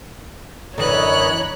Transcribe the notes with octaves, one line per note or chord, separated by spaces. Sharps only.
F#2 D3 E3 C#5 D#5 A#5 B5 F#6